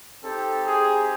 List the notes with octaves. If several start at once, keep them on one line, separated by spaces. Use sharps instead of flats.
C4 D#4 G4 A4
G#4